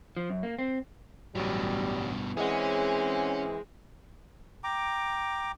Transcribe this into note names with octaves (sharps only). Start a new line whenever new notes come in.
F3
F#2
A#3
C4
A1 G2 B2 F#3 G3
E3 G#3 C4 C#4 G#4 D#5 F#5
G5 A#5 D6